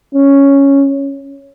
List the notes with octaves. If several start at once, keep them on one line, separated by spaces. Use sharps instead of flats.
C#4